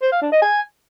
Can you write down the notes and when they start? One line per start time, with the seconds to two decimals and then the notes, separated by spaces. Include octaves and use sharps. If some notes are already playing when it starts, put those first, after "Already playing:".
0.02 C5
0.12 F5
0.22 D4
0.32 D#5
0.42 G#5